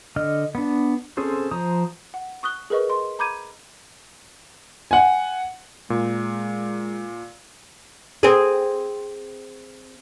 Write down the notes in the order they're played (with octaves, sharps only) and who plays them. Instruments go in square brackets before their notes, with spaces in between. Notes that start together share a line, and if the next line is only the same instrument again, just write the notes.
[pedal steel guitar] D3 D#5 F6
B3 D4
C4 C#4 G#4 A4 C5
F3 C5 A#5 D#6
[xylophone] F#5
C#6 D#6 F#6 G7
G#4 A#4 B4 D#5 C#6
D#5 C6
A#5 B5 D6 G6 G#6 D#7
[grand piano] F#5 G#5
[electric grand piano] A#2 [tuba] G#3
[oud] C4 G#4